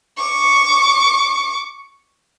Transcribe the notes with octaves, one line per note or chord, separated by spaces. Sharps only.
C#6 D6